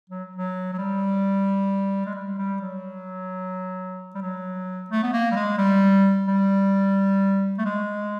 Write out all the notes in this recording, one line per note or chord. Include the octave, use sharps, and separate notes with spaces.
F#3
F#3
F#3
G3
G#3
G3
G3
F#3
G3
F#3
A3
B3
A#3
G3
G#3
G3
G3
A3
G#3